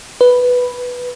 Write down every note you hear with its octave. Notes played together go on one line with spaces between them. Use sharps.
B4